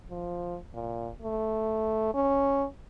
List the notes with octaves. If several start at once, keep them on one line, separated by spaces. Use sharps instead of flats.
F3
A#2
A3
C#4